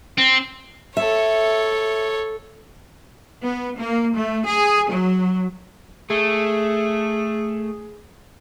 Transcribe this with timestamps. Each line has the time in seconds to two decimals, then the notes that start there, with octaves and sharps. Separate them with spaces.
0.18 C4
0.97 A4 C#5 E5
3.43 B3
3.78 A#3
4.15 A3
4.46 G#4
4.92 F#3
6.10 A3 G#4